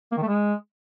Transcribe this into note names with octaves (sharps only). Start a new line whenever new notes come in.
A#3
D#3
A3
G#3